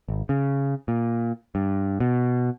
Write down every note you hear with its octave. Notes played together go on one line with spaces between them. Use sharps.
G#1
C#3
A#2
G2
B2